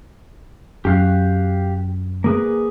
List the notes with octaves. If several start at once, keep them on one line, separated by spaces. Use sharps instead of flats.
F#2 G4 F5 F#6
A#3 G#4 B4